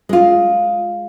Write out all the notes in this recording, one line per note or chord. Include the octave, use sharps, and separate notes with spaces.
G#3 F4